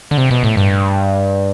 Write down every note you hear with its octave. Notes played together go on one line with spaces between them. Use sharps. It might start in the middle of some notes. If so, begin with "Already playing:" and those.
D3
C3
B2
A2
G2